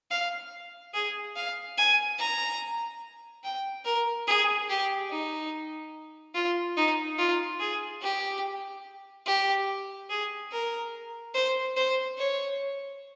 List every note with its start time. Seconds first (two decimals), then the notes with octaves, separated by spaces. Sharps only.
0.11 F5
0.94 G#4
1.36 F5
1.78 G#5
2.18 A#5
3.44 G5
3.85 A#4
4.27 G#4
4.69 G4
5.10 D#4
6.35 F4
6.77 D#4
7.18 F4
7.60 G#4
8.02 G4
9.26 G4
10.10 G#4
10.52 A#4
11.34 C5
11.76 C5
12.18 C#5